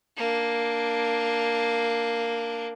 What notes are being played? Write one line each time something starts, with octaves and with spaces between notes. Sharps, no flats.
A#3 D4